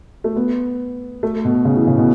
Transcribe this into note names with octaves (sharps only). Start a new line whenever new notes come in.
A3
B3
A3
B2
C#3
E3
C#3
B2